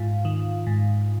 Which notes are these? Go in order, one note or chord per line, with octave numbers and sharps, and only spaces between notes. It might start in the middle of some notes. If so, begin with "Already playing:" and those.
Already playing: G#2 F4 F5
D#3
G#2